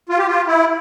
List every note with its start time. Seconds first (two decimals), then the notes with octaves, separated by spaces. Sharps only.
0.09 F4
0.18 G4
0.28 F4
0.47 E4